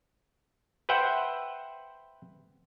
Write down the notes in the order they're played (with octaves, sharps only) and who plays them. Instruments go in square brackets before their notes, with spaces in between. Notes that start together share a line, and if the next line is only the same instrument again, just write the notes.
[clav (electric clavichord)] B4 C5 E5 F#5 G5